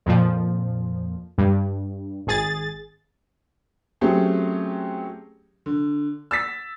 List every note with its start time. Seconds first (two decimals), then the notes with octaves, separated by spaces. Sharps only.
0.06 F2 A#2 F3
1.38 G2
2.27 G#1 G#4 A6
4.01 F#3 A3 C4 C#4 G4 G#4
5.66 D3
6.31 E6 A6 B6